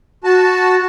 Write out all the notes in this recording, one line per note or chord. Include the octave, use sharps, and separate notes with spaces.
F#4 A5